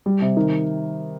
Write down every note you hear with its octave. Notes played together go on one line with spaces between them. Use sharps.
G3
C3
D#3